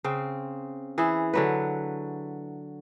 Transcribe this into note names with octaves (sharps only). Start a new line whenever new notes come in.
C#3 C4
E3 E4 G#4
D3 F#3 B4